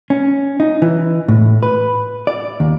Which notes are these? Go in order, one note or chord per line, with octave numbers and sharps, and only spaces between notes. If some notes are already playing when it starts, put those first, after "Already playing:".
C#4
D#4
E3
A2
B4
D5
D#2